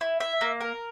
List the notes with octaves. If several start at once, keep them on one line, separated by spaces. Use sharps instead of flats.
E4
E5
A#3
A#4